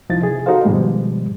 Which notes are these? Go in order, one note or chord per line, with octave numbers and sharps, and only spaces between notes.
C2 F3 D#4 E4 A6
C3 G#4
D#4 F#4 A4 C5 F5
G#2 B2 D#3 F3 G3 G#3